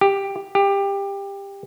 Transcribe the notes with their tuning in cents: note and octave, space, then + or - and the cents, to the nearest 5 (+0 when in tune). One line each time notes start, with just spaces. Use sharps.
G4 +10
G4 +20